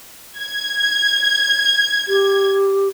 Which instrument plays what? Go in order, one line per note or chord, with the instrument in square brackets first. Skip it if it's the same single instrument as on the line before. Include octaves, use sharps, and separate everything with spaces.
[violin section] G#6
[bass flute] G4